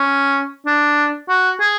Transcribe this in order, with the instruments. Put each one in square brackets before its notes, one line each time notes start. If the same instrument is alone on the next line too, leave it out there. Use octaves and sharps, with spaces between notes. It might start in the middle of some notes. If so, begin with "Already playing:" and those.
Already playing: [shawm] C#4
D4
F#4
G#4